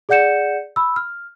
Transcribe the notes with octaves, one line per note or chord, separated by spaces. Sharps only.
G#4 D5 F#5 G6 C#7 E7
B5 E6
F6